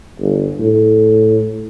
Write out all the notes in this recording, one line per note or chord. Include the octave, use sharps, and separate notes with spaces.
G1
A2